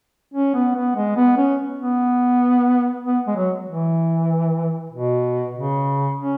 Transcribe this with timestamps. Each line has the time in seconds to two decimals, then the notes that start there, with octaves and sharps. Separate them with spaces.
0.34 C#4
0.55 B3
0.75 B3
0.96 G#3
1.16 B3
1.37 C#4
1.79 B3
3.05 B3
3.27 G#3
3.37 F#3
3.67 E3
4.92 B2
5.55 C#3
6.17 C#4